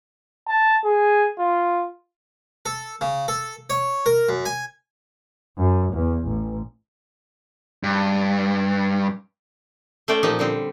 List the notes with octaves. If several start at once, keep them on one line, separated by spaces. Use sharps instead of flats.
A5
G#4
F4
A4
C#3
A4
C#5
A#4
F#2
G#5
F#2
E2
A1
G2
A3 C#4 C5 D5 G5
A#2 F3 D#4 G4
D3 G3 C4